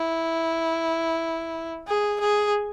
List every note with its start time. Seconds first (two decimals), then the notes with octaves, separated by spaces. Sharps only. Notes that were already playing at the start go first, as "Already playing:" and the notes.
Already playing: E4
1.88 G#4
2.21 G#4